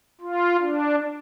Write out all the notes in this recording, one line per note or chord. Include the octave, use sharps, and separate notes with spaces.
F4
D4